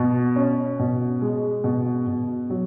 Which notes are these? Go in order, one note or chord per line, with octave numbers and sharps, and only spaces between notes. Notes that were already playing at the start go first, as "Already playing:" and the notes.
Already playing: B2
C#4
B2
G#3
B2
B2
F#3